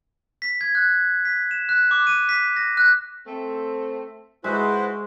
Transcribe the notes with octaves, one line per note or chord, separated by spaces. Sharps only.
B6
G#6
F#6
B6
E7
F#6
D6
D#7
B6
A#6
F#6
A3 C4
G#3 E4 F#4 B4 C5